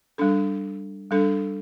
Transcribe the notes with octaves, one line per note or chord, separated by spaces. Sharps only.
G3 D4 A4
G3 D4 A4